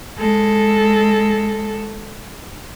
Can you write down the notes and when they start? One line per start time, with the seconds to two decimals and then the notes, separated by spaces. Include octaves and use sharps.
0.19 G#3 A4